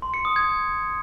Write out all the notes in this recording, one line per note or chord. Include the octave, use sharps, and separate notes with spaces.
C6
C#7
D#6
G#6